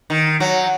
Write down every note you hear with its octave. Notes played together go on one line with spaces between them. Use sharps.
D#3
F#3